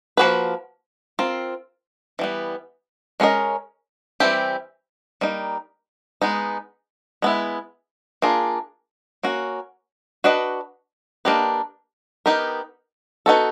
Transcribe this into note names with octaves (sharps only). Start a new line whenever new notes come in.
F3 A#3 C#4 F#4 B4
C4 F4 A#4
E3 G3 B3
G#3 C#4 F4 A#4 D#5
E3 G3 C4 E4 G4
G3 A#3 D#4
G#3 B3 D#4
G#3 B3 E4
A#3 D4 F4 G#4
A#3 C#4 F#4
D4 F#4 B4 D#5
A#3 D4 G4 B4 D#5
B3 D#4 G4 A#4
B3 D#4 F#4 A4